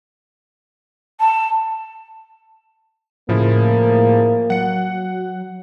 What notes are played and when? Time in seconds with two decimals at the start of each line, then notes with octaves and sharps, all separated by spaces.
1.20 A5
3.29 A2 C#3 F3 A#3 E4
4.50 F#3 F#5 C#7